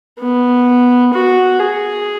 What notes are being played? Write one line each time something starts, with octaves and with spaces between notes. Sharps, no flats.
B3
F#4
G#4